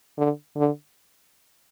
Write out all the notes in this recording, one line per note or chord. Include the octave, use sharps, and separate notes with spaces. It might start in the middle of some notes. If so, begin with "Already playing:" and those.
D3
D3